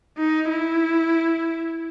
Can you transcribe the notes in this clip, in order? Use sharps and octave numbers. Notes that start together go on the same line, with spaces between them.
D#4
E4